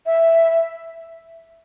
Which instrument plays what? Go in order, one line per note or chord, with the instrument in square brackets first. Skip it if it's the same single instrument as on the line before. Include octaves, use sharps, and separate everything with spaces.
[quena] E5